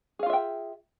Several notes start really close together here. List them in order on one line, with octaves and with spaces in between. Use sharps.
G#4 F5 F4 E5 G5